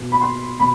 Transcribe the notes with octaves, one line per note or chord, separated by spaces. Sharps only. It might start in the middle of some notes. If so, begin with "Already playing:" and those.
Already playing: B2
B5
C6
B2 B5